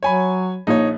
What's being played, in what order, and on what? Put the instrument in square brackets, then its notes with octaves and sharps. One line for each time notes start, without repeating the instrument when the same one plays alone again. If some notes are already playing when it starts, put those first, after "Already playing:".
[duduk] F#3 [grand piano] C#5 G#5 B5
[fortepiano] A#1 [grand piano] D#4 C#5